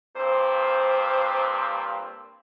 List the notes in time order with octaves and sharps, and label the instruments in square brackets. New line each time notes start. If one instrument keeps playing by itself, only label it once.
[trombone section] G2 A#2 C4 [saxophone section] C5